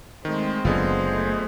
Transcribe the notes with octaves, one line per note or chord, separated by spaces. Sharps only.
D#3 G#3 A3 C4
F#1 D3 B3 F4 G#4 C5 D#5
A3